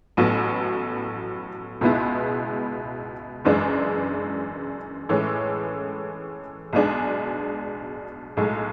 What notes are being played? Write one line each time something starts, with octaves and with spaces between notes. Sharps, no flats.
A1 A2 F#3 B3
C#2 B2 G#3 B3 E4
F#1 F#2 E3 G#3 D4
A2 E3 G#3 C#4
B1 B2 G#3 D4 G#4
B1 A2 G#3